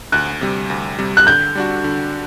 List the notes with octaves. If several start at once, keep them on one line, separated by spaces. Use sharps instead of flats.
D2 F#6
C3 G3
D2
C3 G3
F#6
D3 G6
G3 D4 F#4
D3